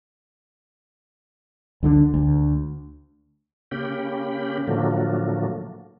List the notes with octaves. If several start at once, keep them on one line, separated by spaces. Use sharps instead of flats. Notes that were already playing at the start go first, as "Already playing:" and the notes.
D2 D3 F#3 D4
D2
C#3 A#3 C#4 G4 G5 B5
A2 D3 F3 F#3 A3 A#3